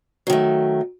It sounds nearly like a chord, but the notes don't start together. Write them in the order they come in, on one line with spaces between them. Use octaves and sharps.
F#3 D#3 A3